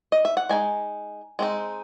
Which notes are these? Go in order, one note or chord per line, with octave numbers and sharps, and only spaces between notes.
D#5
E5
F#5
G#3 D#4 G#5
G#3 C4 D#4